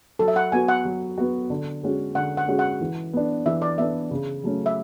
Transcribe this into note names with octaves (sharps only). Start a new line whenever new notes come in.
F#3 A4
E5
F#5
B3 F#4 G#5
F#5
F#3
B3 F#4
D3
G#3 C#4 F#4
D3 F#5
F#5
G#3 C#4 F#4
F#5
E3
B3 D4
E3 E5
D5
B3 D4 E5
C#3
F#3 A3 C#4
E5